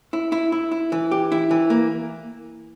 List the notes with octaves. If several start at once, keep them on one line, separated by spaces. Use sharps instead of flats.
E4
E4
E4
E4
E3
G4
E4
E3
A#3